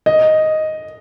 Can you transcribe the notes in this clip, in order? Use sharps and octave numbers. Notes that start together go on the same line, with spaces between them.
D#5